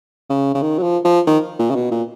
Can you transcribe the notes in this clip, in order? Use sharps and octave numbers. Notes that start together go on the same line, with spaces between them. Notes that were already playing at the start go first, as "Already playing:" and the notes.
C#3
C#3
D#3
F#3
F3
F3
D#3
A#2
C#3
B2
A#2